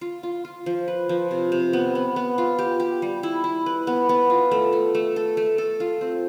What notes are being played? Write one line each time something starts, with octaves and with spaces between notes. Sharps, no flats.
F4
F4
F4
F3
B4
F3
C3
C3
B3
B3
B3
F4
G4
G4
G3
E4
E4
B4
B3
B3
F4
A3
A3
A3
A4
A3
A4
F4
C4